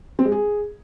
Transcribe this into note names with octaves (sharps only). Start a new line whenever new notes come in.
C4
G#3
G#4